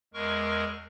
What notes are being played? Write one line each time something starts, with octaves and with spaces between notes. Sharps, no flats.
E2 G#3 A#4 C#6